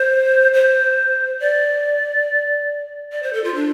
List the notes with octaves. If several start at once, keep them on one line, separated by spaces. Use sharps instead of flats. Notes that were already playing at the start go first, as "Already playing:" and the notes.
Already playing: C5
C5
D5
D5
C5
A4
F4
D4